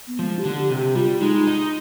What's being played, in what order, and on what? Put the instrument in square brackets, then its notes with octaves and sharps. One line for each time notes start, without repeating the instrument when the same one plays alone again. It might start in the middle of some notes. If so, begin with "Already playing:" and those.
[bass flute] B3
[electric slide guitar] F3 [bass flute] G#3
[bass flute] G4
[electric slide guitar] D3
[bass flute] G4
[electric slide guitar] C3
[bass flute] G4
[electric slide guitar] G3 [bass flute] F4
[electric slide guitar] G#3 [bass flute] D#4
[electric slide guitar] D#4